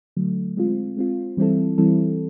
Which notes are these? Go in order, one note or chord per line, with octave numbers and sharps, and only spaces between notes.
D3 F#3 A3
G#3 C4 F4
G#3 C4 F4
E3 G3 C4 E4 A4
E3 G3 C4 E4 A4